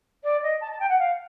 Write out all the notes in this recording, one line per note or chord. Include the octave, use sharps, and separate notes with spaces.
D5
D#5
A5
A5
G5
F#5
F5